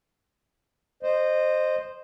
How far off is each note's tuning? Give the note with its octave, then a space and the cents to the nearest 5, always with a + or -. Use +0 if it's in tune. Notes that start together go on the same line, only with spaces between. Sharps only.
C5 +0 D#5 -20